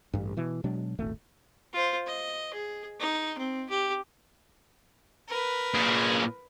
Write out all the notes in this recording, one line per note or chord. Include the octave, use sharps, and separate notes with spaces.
A1 G2
B2 E3
B2 F#3 G#3 D4
D#1 G#1 A3
F4 C5
D#5
G#4
D#4
C4
G4
A#4 B4
A#2 G#4